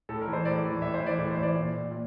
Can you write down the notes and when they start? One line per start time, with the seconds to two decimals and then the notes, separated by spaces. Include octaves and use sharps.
0.09 A2 A4
0.21 A#4
0.27 E3
0.33 C5
0.45 A2 D5
0.64 E3
0.82 A2 E5
0.94 C5
1.00 E3
1.06 D5
1.18 A2
1.31 C5
1.37 E3
1.43 D5
1.55 A#2
1.91 A#2